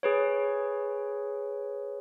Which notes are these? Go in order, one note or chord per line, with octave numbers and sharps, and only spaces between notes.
G#4 B4 C#5